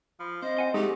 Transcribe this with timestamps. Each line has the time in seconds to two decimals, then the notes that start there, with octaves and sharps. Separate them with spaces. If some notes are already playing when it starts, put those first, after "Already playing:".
0.20 F3 B5
0.42 C4 C5 D#5
0.57 F#5 G#5 C6
0.74 G#3 A3 D#4 G4 G#4